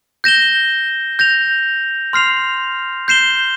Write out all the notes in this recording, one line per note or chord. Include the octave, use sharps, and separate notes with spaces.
G6 A#6 E7 G7
G6 A#6 F7
C6 F6 C7 F7
G6 C7 E7 G7